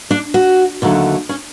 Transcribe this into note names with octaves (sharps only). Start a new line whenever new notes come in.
D4
F#4
D#2 D3 F#3 A3
C#4